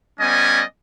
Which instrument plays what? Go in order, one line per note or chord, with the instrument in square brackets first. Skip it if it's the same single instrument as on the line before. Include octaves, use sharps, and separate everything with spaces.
[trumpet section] G3 B3 C#4 D5 D#5 G#5